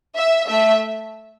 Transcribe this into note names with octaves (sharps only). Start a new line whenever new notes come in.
E5
A3 E5